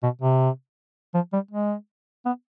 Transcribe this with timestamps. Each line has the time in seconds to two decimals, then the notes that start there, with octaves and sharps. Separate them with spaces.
0.03 B2
0.22 C3
1.14 F3
1.33 G3
1.51 G#3
2.26 B3